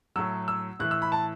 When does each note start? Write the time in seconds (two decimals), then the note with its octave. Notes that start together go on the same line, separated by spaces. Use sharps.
0.16 A2 F#3 E6
0.48 E6
0.79 A2 E3 F#6
0.91 E6
1.02 B5
1.12 A5